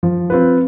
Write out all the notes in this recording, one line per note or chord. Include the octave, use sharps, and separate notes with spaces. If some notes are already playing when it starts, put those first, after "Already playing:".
F3
C4 F4 B4